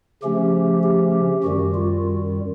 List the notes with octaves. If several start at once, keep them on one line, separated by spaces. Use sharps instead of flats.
C#3 F3 A3 C#4 G4
G4
F#2 D#3 G3 F#4
F4